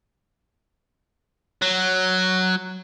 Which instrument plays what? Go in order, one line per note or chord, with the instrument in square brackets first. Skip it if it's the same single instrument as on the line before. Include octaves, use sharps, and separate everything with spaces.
[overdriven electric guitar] F#3